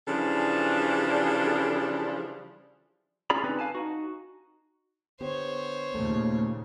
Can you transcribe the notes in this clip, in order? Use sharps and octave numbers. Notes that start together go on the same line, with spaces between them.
C#3 E3 F3 G3 D4 A4
C#4 F4 G#4 D5 A#5 B5
D3 C4 C#4 D#4 B4
B4 F5 G#5 A5
D#4 F#4
D3 B3 G4 C5 C#5
D#2 A#2 C#3 A3 A#3